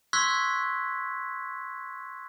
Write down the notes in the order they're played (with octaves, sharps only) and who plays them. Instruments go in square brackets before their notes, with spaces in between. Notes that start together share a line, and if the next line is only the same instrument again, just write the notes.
[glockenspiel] C6 C#6 E6 F#6 G#6 B6